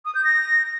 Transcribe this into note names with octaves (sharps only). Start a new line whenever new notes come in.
D#6
G6
A#6